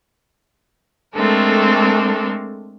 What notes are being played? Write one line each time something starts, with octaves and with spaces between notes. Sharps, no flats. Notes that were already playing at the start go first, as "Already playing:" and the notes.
G#3 A3 C4 D4 A4 A#4